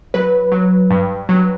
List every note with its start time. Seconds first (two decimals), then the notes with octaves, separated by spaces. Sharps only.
0.14 F#3 B4
0.52 F#3
0.91 G2
1.29 F#3